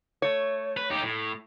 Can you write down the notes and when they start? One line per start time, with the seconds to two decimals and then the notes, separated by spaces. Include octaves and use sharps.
0.22 A3 C#5
0.77 B4
0.90 D#4 G4
1.03 A2